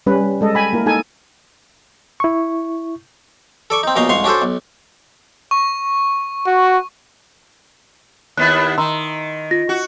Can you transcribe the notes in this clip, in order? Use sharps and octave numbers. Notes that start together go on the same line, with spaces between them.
G3 C#4 B4
G#3 A4 D#5
G5 G#5 B5
A#3 E4 A#4
D#4 A4 G#5
E4 C#6
A4 D5 C#6
C4 D#4
A#1 B2 C#4 D#4 D#5 F5
C2 G#2 F5 C6 C#6
C#4 D4 F#4 A4 C5
B1
C#6
F#4
D#2 B3 E4 F#6
D#3 A#5 C6 E6
F4 A#6
F#4